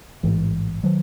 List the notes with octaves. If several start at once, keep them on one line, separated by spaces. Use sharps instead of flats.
A1 G#2 E3
D#3 F#3